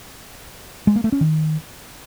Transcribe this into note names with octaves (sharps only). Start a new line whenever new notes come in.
G#3
A#3
A3
C#4
D#3